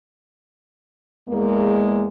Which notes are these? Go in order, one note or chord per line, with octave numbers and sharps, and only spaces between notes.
E2 G#3 A#3